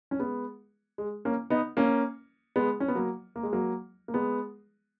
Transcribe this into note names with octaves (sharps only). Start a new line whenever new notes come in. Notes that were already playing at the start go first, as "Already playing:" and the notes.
C#4
G#3 B3
G#3
A#3 C#4
B3 D#4
A#3 C#4
G#3 B3
C#4
B3
F#3 A#3
A#3
G#3
F#3 A#3
A#3
G#3 B3